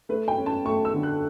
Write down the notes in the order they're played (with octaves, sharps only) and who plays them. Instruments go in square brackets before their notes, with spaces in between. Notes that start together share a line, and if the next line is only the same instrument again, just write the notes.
[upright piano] A3 B4
G5
C#4
A5
A3 C#6
E6
D3
F#6